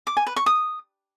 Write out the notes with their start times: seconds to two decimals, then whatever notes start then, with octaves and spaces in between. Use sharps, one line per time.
0.07 D6
0.17 G#5
0.27 B4
0.36 C#6
0.46 D#6